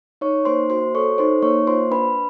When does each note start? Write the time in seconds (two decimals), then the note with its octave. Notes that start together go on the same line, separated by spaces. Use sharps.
0.21 D#4 C#5 C#6
0.45 A#3 C5 C6
0.70 F#4 C5 C6
0.94 A4 C#5 C#6
1.18 D#4 C5 C6
1.42 A#3 C#5 C#6
1.67 F4 C5 C6
1.91 D4 B4 B5